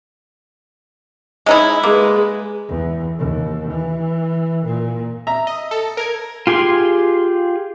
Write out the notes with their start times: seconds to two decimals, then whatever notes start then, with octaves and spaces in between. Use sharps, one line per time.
1.46 G#3 D#4 E4
1.83 G#3 A#3 B4
2.68 E2
3.18 D#2
3.70 E3
4.65 A#2
5.27 E5 A#5
5.47 D#5
5.71 A4
5.97 A#4 G#6
6.47 F4 G4 G#4 C6